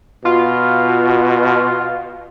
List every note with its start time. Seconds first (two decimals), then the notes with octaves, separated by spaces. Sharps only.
0.25 B2 F4